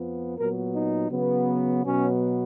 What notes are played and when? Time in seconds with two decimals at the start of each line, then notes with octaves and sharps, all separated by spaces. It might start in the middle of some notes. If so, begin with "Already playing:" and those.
Already playing: F2 F3 B3
0.38 A#2 F#3 B3 A#4
0.74 D#4
1.11 C#3 F#3 B3
1.84 B2 F#3 B3 C#4